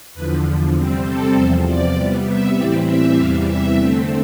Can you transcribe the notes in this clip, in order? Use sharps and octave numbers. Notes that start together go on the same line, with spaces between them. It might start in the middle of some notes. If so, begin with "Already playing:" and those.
E2 D3 F3 B4
C3 G3 C4
A4
E2 C3 F3 C5
D5
C3 G3 B3
E5
A2 E3 G3 C4 D5
E5
E2 C3 E3 G3 F5
E5
D3 A3 C4